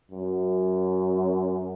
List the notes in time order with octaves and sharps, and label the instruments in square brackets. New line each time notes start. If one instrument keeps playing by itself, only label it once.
[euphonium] F#2